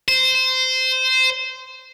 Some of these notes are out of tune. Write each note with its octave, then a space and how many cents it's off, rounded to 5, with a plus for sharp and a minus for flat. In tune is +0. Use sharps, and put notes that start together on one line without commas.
C5 -15